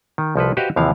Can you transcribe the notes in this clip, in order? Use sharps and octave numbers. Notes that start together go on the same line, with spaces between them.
D#3
C2 F3 A4 B4
F#4 G4 B4 C5 D#5 F5
D#2 C3 E3 F3 F5